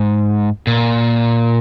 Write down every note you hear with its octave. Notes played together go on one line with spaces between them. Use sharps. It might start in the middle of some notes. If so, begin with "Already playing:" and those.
Already playing: G#2
A#2